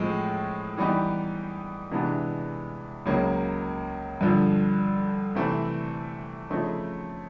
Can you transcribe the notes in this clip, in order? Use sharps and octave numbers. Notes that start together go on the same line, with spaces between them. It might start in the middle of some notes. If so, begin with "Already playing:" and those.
Already playing: A2 F3 G#3 C4
E3 G3 B3 D#4 G4
C3 E3 G#3 B3 D4
C#2 C#3 F#3 A#3
G2 D3 F3
C3 E3 A3 C4
C#3 F3 A3 C4 D#4